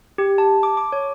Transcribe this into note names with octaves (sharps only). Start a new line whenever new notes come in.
G4
A5
D6
D6
C#5